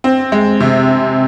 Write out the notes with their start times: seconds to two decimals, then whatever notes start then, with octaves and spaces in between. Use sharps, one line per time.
0.04 C4
0.32 G#3
0.60 C3